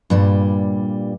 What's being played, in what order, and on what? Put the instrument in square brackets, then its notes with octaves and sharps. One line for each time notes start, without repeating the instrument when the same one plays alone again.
[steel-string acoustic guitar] G2 A#2 G3